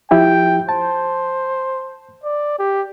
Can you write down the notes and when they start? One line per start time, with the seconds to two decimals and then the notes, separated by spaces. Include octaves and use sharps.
0.11 F3 E4 G4 G5
0.69 C5 A5
2.23 D5
2.59 G4